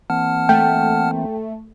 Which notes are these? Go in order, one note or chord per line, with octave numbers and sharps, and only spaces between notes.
E3 A#3 C4 F#5 A5 F6
A3 G5